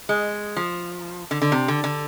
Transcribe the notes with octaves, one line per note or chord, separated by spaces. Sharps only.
G#3
F3
D3
D3
C3
D3
D3